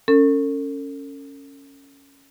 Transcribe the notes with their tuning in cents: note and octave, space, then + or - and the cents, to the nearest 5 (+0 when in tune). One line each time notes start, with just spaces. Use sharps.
C#4 +0 A4 +45